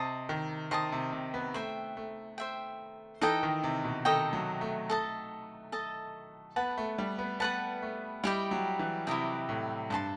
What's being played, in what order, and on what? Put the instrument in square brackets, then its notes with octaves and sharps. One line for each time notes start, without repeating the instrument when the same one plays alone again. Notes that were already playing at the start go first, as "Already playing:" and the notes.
Already playing: [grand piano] C3 [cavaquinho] C5 D#5 A5 D#6
[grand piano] D#3
[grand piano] D#3 [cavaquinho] C5 D#5 A5 D#6
[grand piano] C3
C3
B3
[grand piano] A3 [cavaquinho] C5 E5 G5
[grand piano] A3
[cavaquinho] C5 E5 G5
[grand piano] E3 [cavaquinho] D#4 A4 D#5 G5
[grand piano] D#3
C3
B2
[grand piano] D#3 [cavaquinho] D#4 A4 D#5 G5
[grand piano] F#3
A3
[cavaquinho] A4 D#5 A5
A4 D#5 A5
[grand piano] B3 [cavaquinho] B4 F#5 A5
[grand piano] A3
G3
B3
[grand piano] B3 [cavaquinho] B4 F#5 A5
[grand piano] A3
[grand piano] G3 [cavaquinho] E4 G4 D#5 G5
[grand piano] F#3
E3
[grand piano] C3 [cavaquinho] E4 G4 D#5 G5
[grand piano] A2
[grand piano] G2 [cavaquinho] C5 D#5 A5 C6